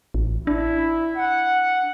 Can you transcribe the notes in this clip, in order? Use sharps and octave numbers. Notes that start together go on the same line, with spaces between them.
A1
D4 E4
F#5